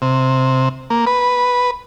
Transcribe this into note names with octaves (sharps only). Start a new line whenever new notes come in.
C3
A#3
B4